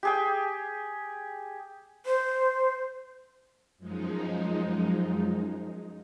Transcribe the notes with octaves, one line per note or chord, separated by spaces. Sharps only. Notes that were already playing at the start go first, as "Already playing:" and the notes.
G4 G#4 G5
C5
F#2 F3 G#3 D#4